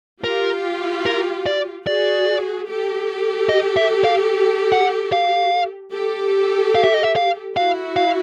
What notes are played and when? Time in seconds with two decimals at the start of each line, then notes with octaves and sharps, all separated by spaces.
0.24 F4 G4 A#4
1.06 A#4
1.46 D5
1.87 F#4 G#4 D5
2.68 G4 A4
3.49 D#5
3.76 E5
4.05 F5
4.72 F#5
5.12 F5
5.94 G4 A4
6.75 F5
6.84 E5
6.94 D#5
7.03 E5
7.16 F5
7.56 E4 F#4 F5
7.96 F5